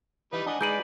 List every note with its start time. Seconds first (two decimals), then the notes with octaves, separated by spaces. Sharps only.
0.33 E3 G3 D#4 B4
0.46 D4 D#5 F#5 G#5
0.61 G#3 D#4 G#4 B4 D5 G6 D7 F#7